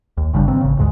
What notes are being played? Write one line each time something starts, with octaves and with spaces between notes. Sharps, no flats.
D#2
G1 C#3 G3 D4
F#1 A#2 D#3 C4
A1 C#3
D2 G#2 D3 G#3